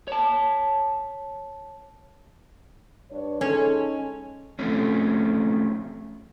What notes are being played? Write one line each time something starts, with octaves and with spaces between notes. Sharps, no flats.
C#5 A5
G2 D4 C#5
G#3 C#4 D#4 A4
F3 A3 C4 C#4